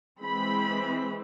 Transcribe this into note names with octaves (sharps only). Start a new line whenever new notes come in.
E3 G#3 C4 B5